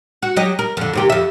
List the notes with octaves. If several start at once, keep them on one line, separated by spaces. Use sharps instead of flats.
F#4
F#3 G4 D#5
A#4
F2 D3
D#2 C3 G4
F2 E5